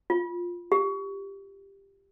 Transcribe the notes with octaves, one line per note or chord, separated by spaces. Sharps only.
F4
G4